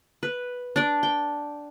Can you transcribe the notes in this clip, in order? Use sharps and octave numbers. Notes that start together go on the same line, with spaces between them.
B4
D4 D5
G5